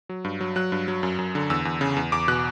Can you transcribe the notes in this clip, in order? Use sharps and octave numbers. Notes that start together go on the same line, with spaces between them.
F#3
G2
F#3
F#3 F#6
G2
F#3
F#2
F#2
D3
E2 E6
E2
C#3
E2
E2 D6
B2 F#6